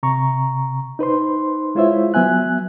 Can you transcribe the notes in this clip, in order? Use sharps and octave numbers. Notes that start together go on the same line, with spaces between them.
C3 A#5 C#6
D#4 B4 C5 C6
G#3 E4 F4 C5 C#5 E5
F#3 B3 E5 G#5 F#6